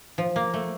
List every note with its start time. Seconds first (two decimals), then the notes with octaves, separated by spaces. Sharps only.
0.18 F3
0.36 A#3
0.54 A3